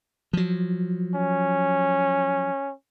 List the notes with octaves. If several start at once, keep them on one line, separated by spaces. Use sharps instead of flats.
F3 F#3
C#4